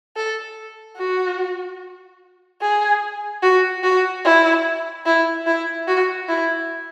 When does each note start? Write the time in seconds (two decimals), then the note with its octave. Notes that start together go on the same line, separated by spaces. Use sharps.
0.17 A4
0.98 F#4
2.62 G#4
3.43 F#4
3.83 F#4
4.25 E4
5.06 E4
5.47 E4
5.88 F#4
6.29 E4